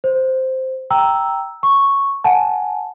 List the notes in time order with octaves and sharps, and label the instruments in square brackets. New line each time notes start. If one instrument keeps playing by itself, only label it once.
[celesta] C5
G5 A#5 E6
C#6
F#5 G#5 A5